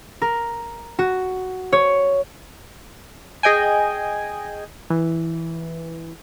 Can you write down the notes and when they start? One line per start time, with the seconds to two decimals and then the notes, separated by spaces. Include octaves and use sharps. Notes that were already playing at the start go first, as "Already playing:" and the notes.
0.22 A#4
0.99 F#4
1.72 C#5
3.43 G#4 D#5 G5 G#5
4.90 E3